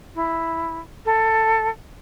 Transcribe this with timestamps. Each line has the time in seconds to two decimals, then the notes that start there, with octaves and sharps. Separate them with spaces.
0.15 E4
1.06 A4